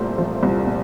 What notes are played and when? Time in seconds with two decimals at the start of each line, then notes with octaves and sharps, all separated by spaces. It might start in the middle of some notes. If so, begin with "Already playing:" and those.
Already playing: C2 A#2 A3 C5
0.18 F3
0.43 C2
0.67 A#2